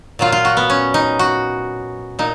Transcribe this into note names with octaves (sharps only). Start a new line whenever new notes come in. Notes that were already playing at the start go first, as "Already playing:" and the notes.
A#2 F#3 F4
F4
F#4
B3
C#4
D#4
F#4
A#2 D#4